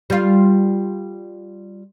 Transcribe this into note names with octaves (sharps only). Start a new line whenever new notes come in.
G3 F4